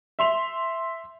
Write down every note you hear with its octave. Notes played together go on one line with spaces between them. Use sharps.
E5 C6 F7